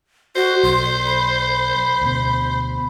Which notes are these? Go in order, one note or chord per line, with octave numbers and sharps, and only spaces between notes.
F#4 C5
B1 C6
B5
D2 B2